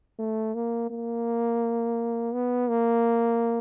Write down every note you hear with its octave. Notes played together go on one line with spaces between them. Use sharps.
A3
A#3
A#3
B3
A#3